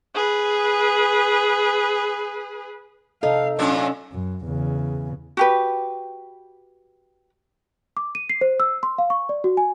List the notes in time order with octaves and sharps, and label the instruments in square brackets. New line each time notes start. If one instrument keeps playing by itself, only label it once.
[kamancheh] G#4 B4
[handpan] C3 A4 [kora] D#4 [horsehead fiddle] F5
[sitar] F#2 A#2 D4 [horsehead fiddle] C#4
[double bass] F#2
E2 C#3
[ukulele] F#4 G4 B4
[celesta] D6
D#7
C7
C5
E6
C6
F5
C#6
D5
F#4
G#5